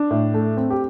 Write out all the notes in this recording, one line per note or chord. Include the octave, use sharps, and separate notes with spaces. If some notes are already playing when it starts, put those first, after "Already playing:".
Already playing: D4
A2
A3
C4
G4